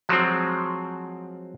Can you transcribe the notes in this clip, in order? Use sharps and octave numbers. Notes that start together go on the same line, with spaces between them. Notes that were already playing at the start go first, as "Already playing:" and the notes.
F3 F#3 G#3 C4